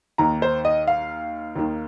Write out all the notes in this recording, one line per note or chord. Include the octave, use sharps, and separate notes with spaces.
D#2 D#3 A#5
C5
D#5
F5
D#2 D#3